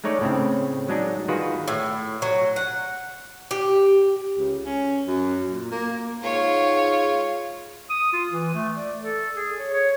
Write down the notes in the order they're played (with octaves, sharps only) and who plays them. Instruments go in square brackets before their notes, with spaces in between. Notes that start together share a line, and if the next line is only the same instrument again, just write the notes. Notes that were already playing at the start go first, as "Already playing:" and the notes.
[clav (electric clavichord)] G#3 A3 D#4 C#5 D5
A2 C#3 C4
F#3 G#3 D4 D#4
D#3 F4 F#4 G#4 B4
[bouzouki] A2
F#3
F#5
G4
[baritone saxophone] C#2
C#4
F#2
A#2
A#3
[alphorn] G#2 [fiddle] F4 C#5
[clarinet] D#6
F4
E3
A3
D5
A4
G#4
C#5
C#5